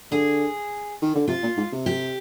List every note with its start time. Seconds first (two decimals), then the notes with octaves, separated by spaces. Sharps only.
0.12 D3 G#4
1.02 D#3
1.15 D3
1.28 C3 F4
1.43 A#2
1.57 G#2
1.72 C3
1.86 G4